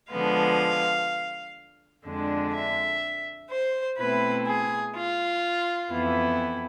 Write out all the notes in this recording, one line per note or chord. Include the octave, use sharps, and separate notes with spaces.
D3 F3 G#3 B3 F5
F2 D3 G#3 D4
E5
C5
B2 A3 C4 E4 B4
G#4
F4
F2 E3 B3 E4